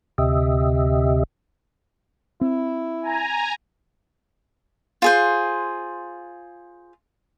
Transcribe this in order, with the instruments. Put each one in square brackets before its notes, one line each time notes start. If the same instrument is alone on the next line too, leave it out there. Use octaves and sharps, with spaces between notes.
[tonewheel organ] D2 C3 G4 D#5 E5
[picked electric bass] C4 [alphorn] E4
[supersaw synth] G#5 A#5
[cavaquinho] F4 G#4 C5